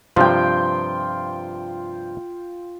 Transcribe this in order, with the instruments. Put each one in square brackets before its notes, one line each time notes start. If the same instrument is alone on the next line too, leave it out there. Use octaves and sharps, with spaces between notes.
[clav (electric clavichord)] G2 C3 F3 [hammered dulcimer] F4 G5